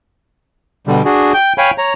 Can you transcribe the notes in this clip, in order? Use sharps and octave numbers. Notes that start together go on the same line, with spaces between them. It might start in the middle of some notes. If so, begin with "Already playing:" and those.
B2 D3 G3
D4 F#4 G#4
G5 G6
C#5 F5 G5 G#5 B5
C#5 A#5